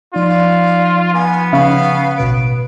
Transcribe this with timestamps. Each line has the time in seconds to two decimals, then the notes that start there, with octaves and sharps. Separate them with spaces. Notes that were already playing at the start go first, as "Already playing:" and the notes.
0.14 F3 D#4 F4 D5
1.14 B3 G#5
1.53 C#3 F5
2.18 A1 B2 B4 D7